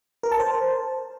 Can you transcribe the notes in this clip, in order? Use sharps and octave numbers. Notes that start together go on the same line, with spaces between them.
A#4
A5
C5